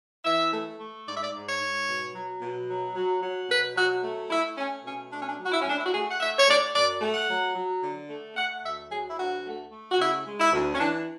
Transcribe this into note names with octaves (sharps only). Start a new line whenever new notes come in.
E3 E5
A3
A3
G#2 D5
E5
D5
G#2
C#5
G#2
B2
F#3
B2
F#3
F#3
F#3
B2 B4
F#3 F#4
A3
A3 E4
A3 C#4
B2 C#4
A3 D4
C#4
D4
F#3
F#4
E4
C#4
A2 D4
E4
F#4
A3 G#4
F#5
A3 E5
C#5
A2 D5
F#2 D5
A3
F#5
F#3
F#3
D3
A3
A3 F#5
D2 E5
F#3 G#4
E4
D2 F#4
A3
A3
F#4
C#3 E4
G#3
E4
D2
C#4
E3 D4